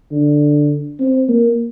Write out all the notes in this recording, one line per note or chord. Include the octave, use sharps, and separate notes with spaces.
D3
C4
A#3